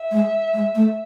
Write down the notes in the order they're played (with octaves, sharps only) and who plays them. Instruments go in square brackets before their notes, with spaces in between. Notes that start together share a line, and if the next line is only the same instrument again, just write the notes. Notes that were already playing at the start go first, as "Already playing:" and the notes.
Already playing: [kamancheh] E5
[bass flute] G#3
G#3
A3